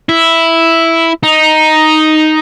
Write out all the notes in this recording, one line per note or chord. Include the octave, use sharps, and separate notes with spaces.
E4
D#4